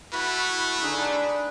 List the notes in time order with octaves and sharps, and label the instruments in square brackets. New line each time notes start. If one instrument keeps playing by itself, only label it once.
[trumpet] A3 [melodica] E4 F#4 B5 [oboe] B4
[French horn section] D3 D4 [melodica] D#4 G#4